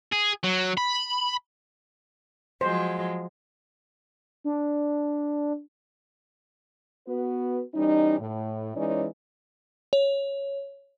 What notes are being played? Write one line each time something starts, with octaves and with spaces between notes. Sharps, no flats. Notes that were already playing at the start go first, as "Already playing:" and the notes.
G#4
F#3
B5
F3 F#3 G#3 C5
D4
B3 F#4 B4
E3 G3 C#4 D#4
A2
E3 G#3 C#4 D#4 C#5 D5
C#5